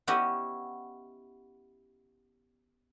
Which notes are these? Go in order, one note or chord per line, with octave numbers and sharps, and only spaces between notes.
B3 C#4 E4 F#4 G4 D#5